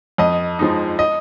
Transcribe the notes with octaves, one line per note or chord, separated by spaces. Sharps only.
F2 D#5
F3 G#3 D#4
D#5